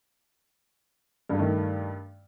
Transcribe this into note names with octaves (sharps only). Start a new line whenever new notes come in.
G2 D#3 A3